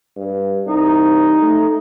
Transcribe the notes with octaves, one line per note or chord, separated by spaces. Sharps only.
G2
C2 D#4
A3